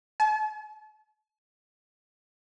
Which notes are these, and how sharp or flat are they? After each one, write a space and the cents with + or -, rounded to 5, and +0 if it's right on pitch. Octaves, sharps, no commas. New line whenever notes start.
A5 -40